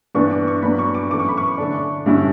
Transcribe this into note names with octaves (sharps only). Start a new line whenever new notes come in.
G2 E3 B3 D4 C#6
D6
C#6
G2 F#3 B3 D4 B5
C#6
D6
F#2 E3 A3 D6
C#6
B5
C#6
D3 A3 D4
G2 D3 G3 C#4 E4